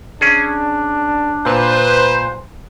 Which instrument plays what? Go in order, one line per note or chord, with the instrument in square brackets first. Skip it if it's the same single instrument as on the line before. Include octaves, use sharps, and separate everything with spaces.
[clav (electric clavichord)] C#4 G#4 [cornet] D4
[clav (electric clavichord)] A#2 [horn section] B4 C5